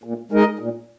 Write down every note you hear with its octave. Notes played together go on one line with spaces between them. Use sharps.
A#2
G#3 D#4 A#4 D#5
A#2